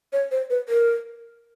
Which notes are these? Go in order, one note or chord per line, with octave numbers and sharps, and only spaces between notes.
C#5
C5
B4
A#4